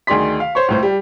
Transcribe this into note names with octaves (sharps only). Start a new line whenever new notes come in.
D2 D#3 G#4 D5 C6 B6
F5
C5 C#5 C#6
C#2 A2 C5
G3